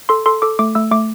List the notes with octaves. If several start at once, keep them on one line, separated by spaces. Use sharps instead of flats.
A4 C6
A4 C6
A4 D6
A3 D6
A3 E6
A3 D6